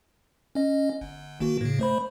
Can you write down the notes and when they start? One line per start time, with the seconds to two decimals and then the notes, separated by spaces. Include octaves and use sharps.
0.55 C#4 D#5
1.01 G1
1.40 D#3 A#3 F#4
1.61 A2 C#3
1.79 A3 C5 B5